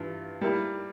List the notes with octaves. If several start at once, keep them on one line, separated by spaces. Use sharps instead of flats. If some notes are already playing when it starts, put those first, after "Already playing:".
Already playing: G2 E3 F4
G3 A#3 E4